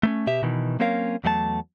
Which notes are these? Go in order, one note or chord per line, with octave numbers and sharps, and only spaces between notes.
A3 A#3 C#4
B2 G4 E5
B2 D#3 E3
F#3 A#3 C4 C#4 A#4 F5
E2 F#3 A3 D#5 A5